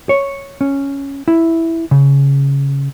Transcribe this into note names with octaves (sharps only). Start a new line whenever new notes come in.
C#5
C#4
E4
C#3